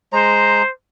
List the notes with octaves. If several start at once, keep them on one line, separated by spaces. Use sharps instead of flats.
G#3 C5 A#5